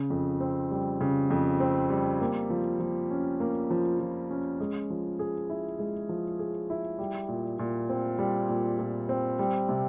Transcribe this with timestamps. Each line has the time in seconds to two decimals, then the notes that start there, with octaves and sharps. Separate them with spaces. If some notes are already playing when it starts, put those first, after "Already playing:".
Already playing: C#3
0.10 F2
0.40 C4
0.71 G3
1.01 C#3
1.31 F2
1.60 C4
1.90 G3
2.21 A#3
2.50 F3
2.80 F3
3.11 C#4
3.40 A#3
3.71 F3
4.00 F3
4.30 C#4
4.60 G#3
4.90 F3
5.19 G#4
5.50 E4
5.79 G#3
6.09 F3
6.39 G#4
6.70 E4
6.99 G3
7.29 A#2
7.59 A#2
7.89 C4
8.19 G3
8.49 A#2
8.79 A#2
9.09 C4
9.39 G3
9.69 C3